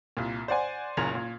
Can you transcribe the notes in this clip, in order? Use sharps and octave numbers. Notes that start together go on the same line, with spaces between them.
C2 A#2
C5 D5 F#5 G#5
F#1 F#2 A#2 A#4 G#6 F7
A#2